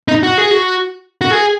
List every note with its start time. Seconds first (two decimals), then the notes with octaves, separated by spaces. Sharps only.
0.08 D#4
0.23 F#4
0.38 G#4
0.51 F#4
1.21 F#4
1.31 G#4